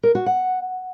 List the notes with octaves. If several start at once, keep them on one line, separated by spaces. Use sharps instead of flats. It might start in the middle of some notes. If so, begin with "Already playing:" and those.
A#4
F#4
F#5